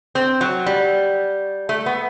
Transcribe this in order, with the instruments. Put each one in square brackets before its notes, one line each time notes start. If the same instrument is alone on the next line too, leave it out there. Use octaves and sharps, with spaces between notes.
[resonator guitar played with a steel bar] C4
F#3
G3
A3
B3